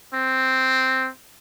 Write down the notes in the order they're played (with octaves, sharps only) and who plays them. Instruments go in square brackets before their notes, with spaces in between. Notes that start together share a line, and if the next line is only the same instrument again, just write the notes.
[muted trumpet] C4